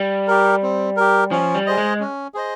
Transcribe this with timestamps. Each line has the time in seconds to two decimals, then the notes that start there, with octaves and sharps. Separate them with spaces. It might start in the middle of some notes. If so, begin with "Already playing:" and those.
Already playing: G3
0.28 G4 A#4
0.62 C4
0.97 G4 A#4
1.31 F3 C#4
1.54 G3
1.67 G#4 C5 D#5
1.77 G#3
2.00 C#4
2.34 G#4 C5 D#5